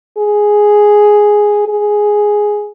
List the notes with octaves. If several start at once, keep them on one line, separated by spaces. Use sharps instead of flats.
G#4
G#4